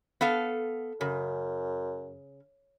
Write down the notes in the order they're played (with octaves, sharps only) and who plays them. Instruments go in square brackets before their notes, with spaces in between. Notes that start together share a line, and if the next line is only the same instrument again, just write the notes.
[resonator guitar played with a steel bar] B3 A4 F5
[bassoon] F#2 [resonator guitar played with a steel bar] C#3